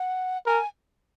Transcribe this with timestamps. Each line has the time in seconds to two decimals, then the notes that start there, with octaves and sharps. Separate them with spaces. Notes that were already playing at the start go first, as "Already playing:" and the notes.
Already playing: F#5
0.46 A#4 G#5